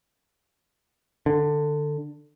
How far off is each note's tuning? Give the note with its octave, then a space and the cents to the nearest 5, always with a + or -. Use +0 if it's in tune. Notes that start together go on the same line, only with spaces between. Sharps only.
D3 +15